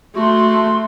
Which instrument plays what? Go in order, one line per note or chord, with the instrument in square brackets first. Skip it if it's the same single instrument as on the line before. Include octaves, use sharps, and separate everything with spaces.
[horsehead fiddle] A3 [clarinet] F#4 [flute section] C6